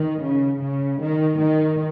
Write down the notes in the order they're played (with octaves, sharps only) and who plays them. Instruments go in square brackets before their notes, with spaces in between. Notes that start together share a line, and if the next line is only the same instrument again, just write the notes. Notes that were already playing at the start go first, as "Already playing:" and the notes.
Already playing: [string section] D#3
C#3
C#3
D#3
D#3